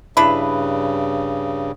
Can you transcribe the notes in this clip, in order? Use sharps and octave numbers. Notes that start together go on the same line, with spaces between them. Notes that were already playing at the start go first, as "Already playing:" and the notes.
G2 C#3 D4 E4 B4